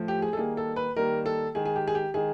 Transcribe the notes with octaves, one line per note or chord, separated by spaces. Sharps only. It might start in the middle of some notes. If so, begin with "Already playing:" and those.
Already playing: A2 F3 A3
G4
G#4
A4
D#3 G3 A#3 G#4
A4
B4
D#3 G3 A#3 A#4
A4
D#3 G#3 G#4
G#4
G4
G#4
G4
D#3 G#3 G#4